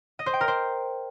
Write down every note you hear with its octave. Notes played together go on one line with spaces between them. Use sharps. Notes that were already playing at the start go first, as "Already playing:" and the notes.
D#5
C5
G5
A#4
C5